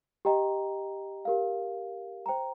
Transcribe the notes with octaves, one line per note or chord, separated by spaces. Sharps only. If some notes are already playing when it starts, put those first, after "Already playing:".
G4 D#5 G5 A#5
G4 A#4 F5
C5 G5 A#5